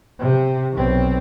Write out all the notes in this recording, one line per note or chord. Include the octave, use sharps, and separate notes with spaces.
C3
B1 C4